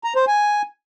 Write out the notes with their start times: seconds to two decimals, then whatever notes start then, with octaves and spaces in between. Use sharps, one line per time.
0.04 A#5
0.16 C5
0.27 G#5